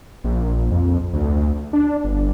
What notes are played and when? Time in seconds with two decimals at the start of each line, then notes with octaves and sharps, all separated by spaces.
0.24 A#1
0.71 F2
1.13 D2
1.73 D4
2.04 G1